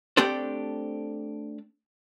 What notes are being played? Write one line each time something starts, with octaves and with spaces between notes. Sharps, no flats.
A3 C4 D4 G4 A4 C5